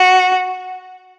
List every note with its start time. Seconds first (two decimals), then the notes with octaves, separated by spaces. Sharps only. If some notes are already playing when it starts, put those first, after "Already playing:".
Already playing: F#4